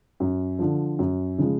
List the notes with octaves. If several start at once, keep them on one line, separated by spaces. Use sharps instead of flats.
F#2
D3 F3
F#2
C#3 F3 G#3